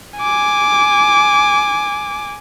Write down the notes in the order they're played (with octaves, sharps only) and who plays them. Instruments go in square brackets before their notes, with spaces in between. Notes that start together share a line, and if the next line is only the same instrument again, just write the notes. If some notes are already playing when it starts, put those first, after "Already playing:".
[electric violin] G#5 D6